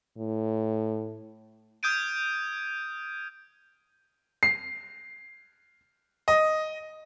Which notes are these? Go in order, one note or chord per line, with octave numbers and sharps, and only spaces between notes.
A2
D#6 F6 G6 G#6 D7 D#7
C7
D#5